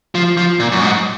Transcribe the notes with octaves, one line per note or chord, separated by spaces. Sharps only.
F3
F3
A#2
F#2
G#2